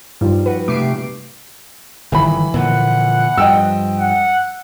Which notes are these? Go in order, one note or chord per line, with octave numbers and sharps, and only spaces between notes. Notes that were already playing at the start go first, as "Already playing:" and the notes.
G2 F3 G3 D#4 F4
F#4 B4
C3 A3 G4 D6 C7 D7
G1 D#3 E3 F#3 B5
A#2 D3 F3 F#5
G2 F3 D#5 G5 E6
F#5